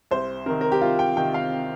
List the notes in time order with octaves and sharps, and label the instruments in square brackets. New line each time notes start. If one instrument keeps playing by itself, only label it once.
[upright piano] C2 C5
C3 D#3 A#4
A#4
G4
C2 F4
G5
C3 D#3 G5
F5